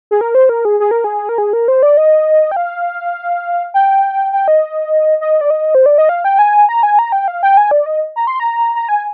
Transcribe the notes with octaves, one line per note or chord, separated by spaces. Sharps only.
G#4
A#4
C5
A#4
G#4
G#4
A#4
G#4
A#4
G#4
A#4
C5
D5
D#5
G5
F5
G5
G5
D#5
D#5
D5
D#5
C5
D5
D#5
F5
G5
G#5
A#5
G#5
A#5
G5
F5
G5
G#5
D5
D#5
A#5
C6
A#5
A#5
G#5